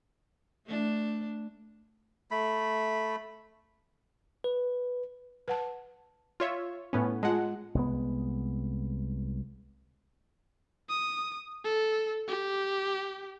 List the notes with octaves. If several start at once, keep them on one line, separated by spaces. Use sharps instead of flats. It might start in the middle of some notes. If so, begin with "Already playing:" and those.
A3 D4
A3 B5
B4
B4 F#5 A5
F4 C#5 E5
A2 B3 C#4
G#3 F4 F#5 A5
C2 G#3 B3
D#6
A4
G4